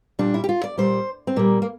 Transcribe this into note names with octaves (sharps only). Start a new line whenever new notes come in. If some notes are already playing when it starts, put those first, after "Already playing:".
A#2 G3 D4
E4
G4
F4
D5
A#2 G3 C5
C4
A#2 G3 A#3
A#3